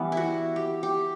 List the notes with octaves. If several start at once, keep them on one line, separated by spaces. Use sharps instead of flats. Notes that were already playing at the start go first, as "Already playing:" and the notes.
Already playing: E3 G3 B3
E4 F#4
G4
G4